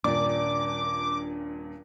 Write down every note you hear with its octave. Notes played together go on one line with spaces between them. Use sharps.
D#1 G2 A#2 D4 D6